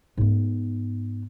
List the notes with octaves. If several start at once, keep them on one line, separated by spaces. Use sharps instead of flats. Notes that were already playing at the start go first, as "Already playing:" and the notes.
G#2 B3